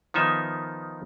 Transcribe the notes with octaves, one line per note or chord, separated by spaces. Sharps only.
D#3 F3 B3 D#4 E5